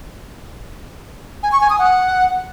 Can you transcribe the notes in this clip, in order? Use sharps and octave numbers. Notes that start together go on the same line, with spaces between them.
G#5
C#6
G#5
D#6
F#5